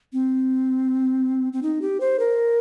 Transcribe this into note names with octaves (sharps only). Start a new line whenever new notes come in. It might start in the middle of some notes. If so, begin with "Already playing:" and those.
C4
C4
D#4
G4
C5
A#4